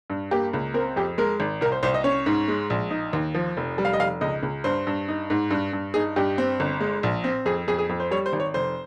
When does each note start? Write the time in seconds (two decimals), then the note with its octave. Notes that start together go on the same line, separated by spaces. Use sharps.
0.10 G2
0.31 A#3 G4
0.53 C#2
0.74 C4 A#4
0.96 F2 G4
1.18 G#3 A#4
1.40 G#1
1.61 C2 A#4
1.72 C5
1.83 C2 C5
1.94 D#5
2.04 C#4 C#5
2.26 G#2
2.48 G#3
2.70 A#1
2.91 D#4
3.13 D#2
3.34 F3
3.57 F1
3.78 G3
3.85 F5
3.93 D#5
3.99 F1 F5
4.21 C#2 D#5
4.43 C#2
4.64 G2 C5
4.87 G2
5.08 D#4
5.30 G#2
5.51 G2
5.73 G2
5.94 D#4 G#4
6.16 G2 G4
6.38 C4
6.60 G1
6.80 G#3
7.03 A#1
7.24 C4
7.45 F2 G#4
7.68 F2 G#4
7.79 G#4
7.89 F2
8.00 C5
8.11 G3 C#5
8.26 C5
8.33 G#1
8.40 C#5
8.54 F1 C5